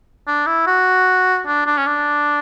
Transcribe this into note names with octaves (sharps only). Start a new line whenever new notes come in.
D4
E4
F#4
D4
D4
C#4
D4